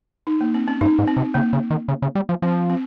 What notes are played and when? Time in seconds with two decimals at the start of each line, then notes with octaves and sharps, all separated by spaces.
0.27 D#4
0.41 A#3
0.54 C4
0.68 C#4
0.81 G2 D#4
0.99 G#2
1.07 C4
1.17 C3
1.34 C#3 A#3
1.53 C#3
1.70 D#3
1.88 C#3
2.02 C#3
2.15 G3
2.29 F3
2.42 F3 C4
2.70 C4